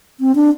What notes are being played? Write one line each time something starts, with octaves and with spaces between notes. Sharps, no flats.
C4
D4